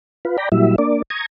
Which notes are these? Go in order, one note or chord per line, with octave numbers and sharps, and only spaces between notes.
F4 B4
D5 G5 A#5 B5
A#2 F#3 G3 E4 E5
A#3 D4 D5
A#5 C#6 D#6 G#6